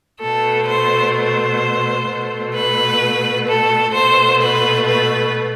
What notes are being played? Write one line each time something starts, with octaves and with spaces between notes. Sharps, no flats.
B2 A3 A4
C5
C5
B2 A3
B4
A4
B2 A3 C5
B4
B4